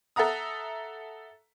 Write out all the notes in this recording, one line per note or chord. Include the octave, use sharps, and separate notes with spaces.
A4 E5 F#5 A#5 D#6